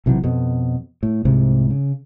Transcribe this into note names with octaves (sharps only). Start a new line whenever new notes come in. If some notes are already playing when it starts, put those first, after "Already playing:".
B1 C3 E3 F#3
F2 B2
A2
C2 G#2 C3
C#3